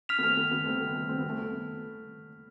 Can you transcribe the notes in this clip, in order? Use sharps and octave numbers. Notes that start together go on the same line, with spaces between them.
F6 B6 F7
B3
A3 C4
B3
B3
A3 C4
B3
A3
C4
B3
A3
B3